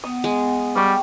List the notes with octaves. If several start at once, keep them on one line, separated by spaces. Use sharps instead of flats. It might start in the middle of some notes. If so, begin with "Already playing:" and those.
B3 D#6
G#3
G3 F5 G5 C#6